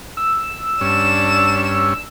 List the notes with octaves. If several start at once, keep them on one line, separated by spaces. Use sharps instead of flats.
E6
G2 C#4 D4 E7